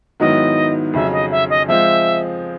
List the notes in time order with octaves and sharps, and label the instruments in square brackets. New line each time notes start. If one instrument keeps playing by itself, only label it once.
[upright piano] G#2 D#3 F#3 B3 E4 [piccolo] D#5
[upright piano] F2 C#3 F#3 [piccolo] E5
[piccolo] D#5
E5
D#5
[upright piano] F3 G#3 C4 F4 [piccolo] E5